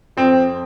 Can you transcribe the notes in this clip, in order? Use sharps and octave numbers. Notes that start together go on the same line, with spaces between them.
F2 C4